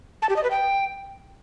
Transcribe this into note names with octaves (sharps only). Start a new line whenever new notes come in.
A5
G4
D#5
B4
G5